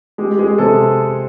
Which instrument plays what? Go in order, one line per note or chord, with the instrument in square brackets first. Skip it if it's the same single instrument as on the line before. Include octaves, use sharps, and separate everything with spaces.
[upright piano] G#3 G4
G#3 G#4
C3 A4